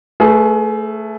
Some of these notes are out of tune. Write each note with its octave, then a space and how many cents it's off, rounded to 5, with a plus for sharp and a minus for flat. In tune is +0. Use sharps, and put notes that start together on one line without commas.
A3 +5 G#4 +30 B4 +0